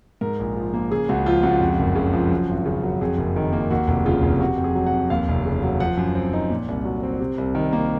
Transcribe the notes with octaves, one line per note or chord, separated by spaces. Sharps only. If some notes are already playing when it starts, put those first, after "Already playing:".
G#2 A#4
A#1
F3
A#3
C#3 G#4
C#2 F#4
F3 F4
C#2 F#4
F2
F#1
C#3
F3
F#2
G#1
C#3
F#3
F2 G#4
F#1
D#3
A#3
D#2 F#4
F1
C#3 F4
F1
C3 F#4
F2
G#4
F#3
F#5
F2
D#2 F5
F1
C#3
F#3
F3 F#5
F#2
C4
D#4
A#2
C2
F#3
C4
C3
C2
D#3
A#3